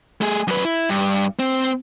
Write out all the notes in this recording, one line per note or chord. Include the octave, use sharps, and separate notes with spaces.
A3 G#4
F#2 B4
E4
G2
C4